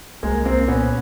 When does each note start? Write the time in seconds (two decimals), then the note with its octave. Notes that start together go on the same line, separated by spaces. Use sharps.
0.23 C2 G#3 A#3
0.45 C2 A#3 C4
0.68 A#2 B3 C#4